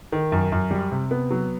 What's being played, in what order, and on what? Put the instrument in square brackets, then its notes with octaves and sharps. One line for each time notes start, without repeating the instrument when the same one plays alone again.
[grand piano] D#3
F#2
F#2
G3
C3
B3
F#3